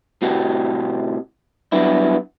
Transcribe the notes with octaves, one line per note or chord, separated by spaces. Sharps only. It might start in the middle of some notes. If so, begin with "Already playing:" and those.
A2 C3 F#4 G4
F#3 G3 B3 D4 E4